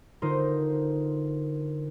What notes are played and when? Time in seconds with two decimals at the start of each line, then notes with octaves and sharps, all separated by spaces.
0.22 D3 D#4 F4 A#4 C5